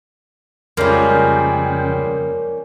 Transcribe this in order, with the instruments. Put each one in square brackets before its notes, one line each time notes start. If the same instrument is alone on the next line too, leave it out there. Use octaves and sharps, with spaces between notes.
[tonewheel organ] F2 C#3 G5 [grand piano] F3 G3 G#3 [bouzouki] A#3 C#4